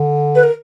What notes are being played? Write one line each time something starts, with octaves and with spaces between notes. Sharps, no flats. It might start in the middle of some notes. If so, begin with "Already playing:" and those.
Already playing: D3
B4
A#4